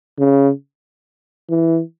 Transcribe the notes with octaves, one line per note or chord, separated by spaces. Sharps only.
C#3
E3